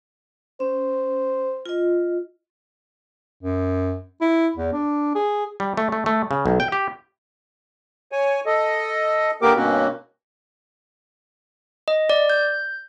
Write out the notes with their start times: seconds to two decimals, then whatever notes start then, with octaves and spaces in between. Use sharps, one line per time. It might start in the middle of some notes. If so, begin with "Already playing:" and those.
0.60 C#4 C5
1.66 F4 D#5
3.41 F#2
4.21 E4
4.56 E2
4.73 D4
5.15 G#4
5.60 G3
5.77 A3
5.92 A3
6.06 A3
6.31 C#3
6.46 B1
6.60 G5
6.72 G4
8.12 C#5 G#5
8.46 A4 D#5
9.42 D3 A#3 B3 G4 A#4 D6
9.56 G2 B2 A#3 C4 C#4 F#4
11.88 D#5
12.10 D5
12.30 G6